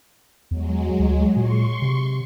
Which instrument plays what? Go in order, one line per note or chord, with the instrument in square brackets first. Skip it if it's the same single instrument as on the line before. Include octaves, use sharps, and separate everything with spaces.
[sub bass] E2 [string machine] F#3 G#3
[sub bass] D2
[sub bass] A#2 [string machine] C6 C#6
[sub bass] C3